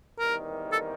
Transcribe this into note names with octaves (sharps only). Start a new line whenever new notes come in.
E2 C3 D#3 G3 A#3 A#4
A4